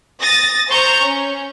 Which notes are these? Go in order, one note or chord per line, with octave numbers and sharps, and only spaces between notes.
D#6 A6 A#6
C5 A#5 C#6 G6
C#4